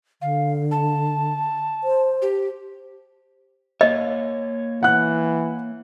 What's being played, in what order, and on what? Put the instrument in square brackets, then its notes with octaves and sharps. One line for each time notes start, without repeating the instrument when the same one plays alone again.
[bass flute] D3 [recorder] F5
[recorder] A5
[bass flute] C5
[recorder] G4
[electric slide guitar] A#3 C#5 [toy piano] D#5
[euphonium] E3 [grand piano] F#5 F#6